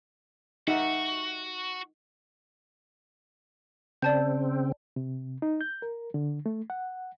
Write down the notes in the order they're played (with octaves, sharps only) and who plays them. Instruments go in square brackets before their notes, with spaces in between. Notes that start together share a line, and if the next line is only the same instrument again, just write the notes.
[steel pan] D#4 [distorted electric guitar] F#4 [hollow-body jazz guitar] G4 E5 F#5
[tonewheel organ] C#3 C4 [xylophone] D5 A5 G6
[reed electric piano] C3
D#4
G6
A#4
D3
A3
F#5